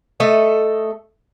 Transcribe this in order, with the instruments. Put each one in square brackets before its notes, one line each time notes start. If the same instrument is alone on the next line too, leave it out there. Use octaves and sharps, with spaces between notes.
[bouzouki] A3 A4 D#5